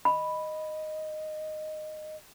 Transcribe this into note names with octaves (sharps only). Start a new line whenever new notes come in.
D#5 B5